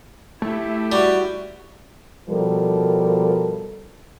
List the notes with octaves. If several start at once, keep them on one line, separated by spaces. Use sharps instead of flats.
A3 E4 G4
G3 F#4
B2 F3 G3 A4 A#4